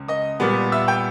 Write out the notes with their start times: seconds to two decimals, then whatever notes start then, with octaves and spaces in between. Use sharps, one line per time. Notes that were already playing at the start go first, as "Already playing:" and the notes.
Already playing: C#2 C#3
0.08 D#5 D#6
0.40 A#2 G3 B3
0.72 E5 E6
0.88 G5 G6